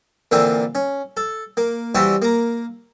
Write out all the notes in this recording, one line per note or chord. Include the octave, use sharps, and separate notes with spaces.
A#2 D3 E3 A#3 C4
C#4
A4
A#3
E3 G3 C4 E4 F#4
A#3 A#5